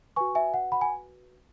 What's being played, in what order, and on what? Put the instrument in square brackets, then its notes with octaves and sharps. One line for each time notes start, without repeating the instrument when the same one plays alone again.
[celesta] F#4 B4 G#5 C#6
E5 G#5
F#5
F#5 B5
G#5